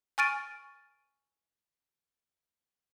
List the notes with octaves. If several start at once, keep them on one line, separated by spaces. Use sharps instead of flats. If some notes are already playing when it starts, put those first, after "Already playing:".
G#5 C#6 F6 A6 D7 D#7